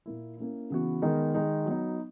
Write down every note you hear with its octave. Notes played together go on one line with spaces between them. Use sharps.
A#2 A#3 E4
A#3 C#4 E4
C#3 E3 B3 F#4
D#3 G#3 B3 D#4 A#4
D#3 G#3 D#4
F#3 B3 D#4